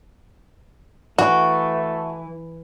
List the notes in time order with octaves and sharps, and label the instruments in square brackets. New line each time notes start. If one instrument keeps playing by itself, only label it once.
[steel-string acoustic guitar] E3 [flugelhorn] A3 [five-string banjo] F#4